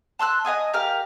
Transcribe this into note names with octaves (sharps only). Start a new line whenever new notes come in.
A5 C6 E6 F#6
D#5 F5 G#5 D#6
G4 A#4 F5 F6